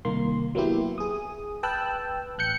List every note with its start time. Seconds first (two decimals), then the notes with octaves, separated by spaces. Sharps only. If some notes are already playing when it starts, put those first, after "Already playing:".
0.05 C2 D#3 A#3 C6
0.55 F#3 A#3 B3 E4 G4
0.98 G#4 D#6
1.63 B4 G5 A5 E6 F#6
2.38 A1 F#6 G6 C#7